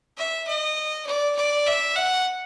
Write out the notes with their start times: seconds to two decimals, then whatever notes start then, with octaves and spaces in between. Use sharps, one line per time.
0.17 E5
0.47 D#5
1.07 D5
1.36 D5
1.67 E5
1.96 F#5